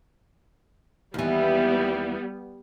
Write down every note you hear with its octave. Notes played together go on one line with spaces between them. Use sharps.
D#2 E3 G3 B3